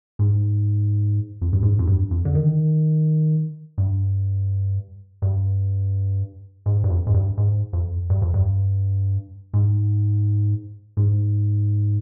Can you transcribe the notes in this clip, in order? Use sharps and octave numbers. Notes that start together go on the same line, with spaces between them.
G#2
F2
G2
G#2
F2
G2
F2
D3
D#3
G2
G2
G#2
G2
F2
G#2
G2
G#2
F2
G2
F2
G2
G#2
G#2